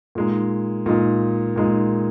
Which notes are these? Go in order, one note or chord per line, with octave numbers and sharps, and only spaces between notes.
A#2 G#3 D#4
A#2 G#3 D#4
A#2 G#3 D#4